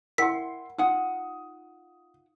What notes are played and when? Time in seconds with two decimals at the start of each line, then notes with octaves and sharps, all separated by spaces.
0.18 E4 A#4 F#5 G5 C6 B6
0.78 D#4 F4 F#5 D#6